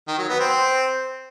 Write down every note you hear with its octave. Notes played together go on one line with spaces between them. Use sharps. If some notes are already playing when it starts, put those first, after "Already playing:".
D#3
F#3
B3
C4